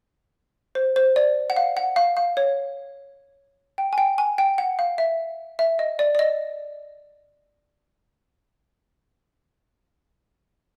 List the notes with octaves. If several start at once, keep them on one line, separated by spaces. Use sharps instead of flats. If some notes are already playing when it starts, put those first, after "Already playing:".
C5
C5
D5
F#5
F5
F#5
F5
F5
C#5
G5
G#5
G5
G#5
G5
F#5
F5
E5
E5
D#5
D5
D5
D#5